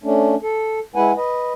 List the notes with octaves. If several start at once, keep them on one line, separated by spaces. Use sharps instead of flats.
A3 C#4 D4
A4
G#3 E4 B4 F#5 G#5
B4 D#5